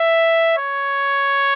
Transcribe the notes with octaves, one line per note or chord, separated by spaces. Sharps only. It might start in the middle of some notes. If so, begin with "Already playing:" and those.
Already playing: E5
C#5